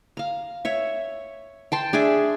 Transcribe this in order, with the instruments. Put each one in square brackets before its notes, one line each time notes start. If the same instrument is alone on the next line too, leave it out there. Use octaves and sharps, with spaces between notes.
[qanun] F5 A#5
C#5 E5
G5 A5 C6
D4 G#4 D5 E5